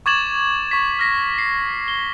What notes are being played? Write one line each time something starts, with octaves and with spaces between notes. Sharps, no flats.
C#6 D6 G#6 A6 E7 F#7
C#6 B6
F6 A#6 B6
C7
G7